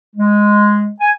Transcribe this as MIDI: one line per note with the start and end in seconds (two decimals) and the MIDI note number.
0.16 0.89 56
1.01 1.10 80